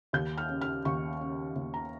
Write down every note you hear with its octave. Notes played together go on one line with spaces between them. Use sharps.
D#2 G6
F6
C#3
F6
D#2 C#6
C#3
D#2
A#5